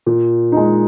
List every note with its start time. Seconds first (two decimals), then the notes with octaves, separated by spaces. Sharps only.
0.06 A#2
0.52 G#3 D#4